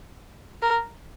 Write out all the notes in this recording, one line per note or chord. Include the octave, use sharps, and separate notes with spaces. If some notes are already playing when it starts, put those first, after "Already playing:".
A#4